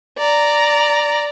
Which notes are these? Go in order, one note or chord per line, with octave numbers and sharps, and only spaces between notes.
D5 A#5